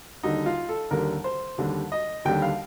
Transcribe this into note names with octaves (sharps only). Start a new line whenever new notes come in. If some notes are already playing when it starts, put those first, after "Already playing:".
D#2 D3 G3 D#4
F4
A4
D#2 D3 G3 A#4
C5
D#2 D3 G3
D#5
D#2 D3 G3 G5
F5